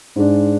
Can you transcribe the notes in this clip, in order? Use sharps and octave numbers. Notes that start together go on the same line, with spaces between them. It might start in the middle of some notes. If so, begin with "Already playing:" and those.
G#2 G#3 D4